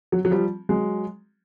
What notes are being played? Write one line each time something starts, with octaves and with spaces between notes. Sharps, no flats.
F#3
F#3
F3 G3
F#3 G#3